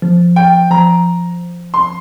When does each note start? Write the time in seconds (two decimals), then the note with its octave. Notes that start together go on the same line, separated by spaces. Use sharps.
0.02 F3
0.36 G5
0.71 F3 A#5
1.74 C6